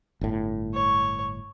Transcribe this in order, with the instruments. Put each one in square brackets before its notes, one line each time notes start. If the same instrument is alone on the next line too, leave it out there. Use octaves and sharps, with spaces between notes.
[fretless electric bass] G1 A2
[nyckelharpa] C#5